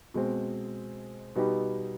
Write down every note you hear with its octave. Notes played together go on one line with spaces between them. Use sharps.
B2 G#3 C4
B2 G3 B3 D#4 G4